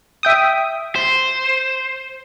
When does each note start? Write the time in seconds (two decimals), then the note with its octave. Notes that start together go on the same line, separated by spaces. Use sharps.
0.23 E5 G5 D#6
0.96 C5